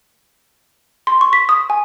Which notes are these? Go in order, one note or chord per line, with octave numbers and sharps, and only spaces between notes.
C6
C#6
B6
D#6
G#5